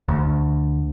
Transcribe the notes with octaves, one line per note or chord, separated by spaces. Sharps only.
D2